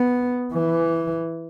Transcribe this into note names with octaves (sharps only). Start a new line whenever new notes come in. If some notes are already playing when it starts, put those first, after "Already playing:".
Already playing: B3
E3